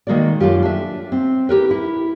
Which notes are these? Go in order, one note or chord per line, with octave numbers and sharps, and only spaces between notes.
D#3 G#3 A#3 F#4 D5
F#2 A3 F4 G4
D4 E5
C4
E4 G4 A#4 B4
E4 E5